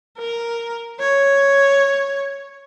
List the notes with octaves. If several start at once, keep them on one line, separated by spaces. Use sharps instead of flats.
A#4
C#5